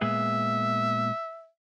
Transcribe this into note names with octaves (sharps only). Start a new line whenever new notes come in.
A#2 G#3 B3 E5